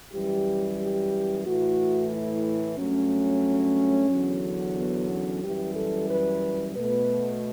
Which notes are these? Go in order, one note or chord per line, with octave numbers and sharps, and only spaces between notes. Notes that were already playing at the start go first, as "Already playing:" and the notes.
F#2 E3 G3 G4
G4
A2 E3 A3 F#4
E4
G2 F#3 A3 C#4
E2 D3 F#3
B3
C#4
F#2 E3 G3 G4
A4
B4
B2 A3 B4